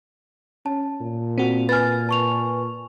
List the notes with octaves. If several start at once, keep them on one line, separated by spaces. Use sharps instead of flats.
C#4 A5
A#2
C4 F#4
B4 G#5 F6 A6
A5 C#6 F7